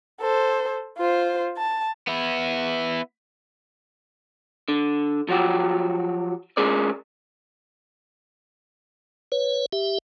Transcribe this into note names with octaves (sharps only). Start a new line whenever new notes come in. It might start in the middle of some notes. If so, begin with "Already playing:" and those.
A4 C5
F4 C5
A5
B3 E4
D3
F3 F#3 F#4 G4
G#3 C#4 G#4 A#4 D5
B4 C#5
G4 E5